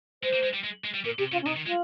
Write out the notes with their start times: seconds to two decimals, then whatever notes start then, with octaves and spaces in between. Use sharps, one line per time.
0.23 G#3 C5
0.33 A#3
0.43 G#3
0.54 G3
0.64 G#3
0.84 G#3
0.94 G3
1.05 A#2 A#4
1.18 C3 G4
1.32 C#3 F4
1.42 C#4
1.46 C3 D#4
1.56 D#3
1.66 G#3 F4